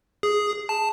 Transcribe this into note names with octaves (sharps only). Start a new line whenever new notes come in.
G#4
A5